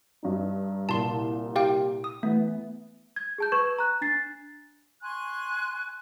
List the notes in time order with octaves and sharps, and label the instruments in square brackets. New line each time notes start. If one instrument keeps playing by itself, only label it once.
[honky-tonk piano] G2 D#4
[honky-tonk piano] C2 A#2 [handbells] A5 C6
[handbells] G4 F5 G5
D#6
[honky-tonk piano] E3 B3 [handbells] A3
[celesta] G#6
G#4 A5 G6
B4 C#6 G#6 E7
A#5 F#6
D4 A6 C7
[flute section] G#5 C6 C#6 F#6